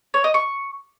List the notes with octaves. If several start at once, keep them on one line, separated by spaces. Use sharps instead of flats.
C#5
D#5
C#6